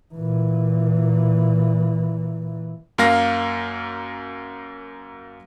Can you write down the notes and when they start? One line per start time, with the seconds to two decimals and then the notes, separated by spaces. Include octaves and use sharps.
0.14 A#2 E3
2.98 F#2 A#3 F5 A#6